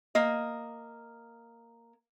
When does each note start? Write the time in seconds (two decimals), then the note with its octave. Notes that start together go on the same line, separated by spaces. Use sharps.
0.15 A#3 D#5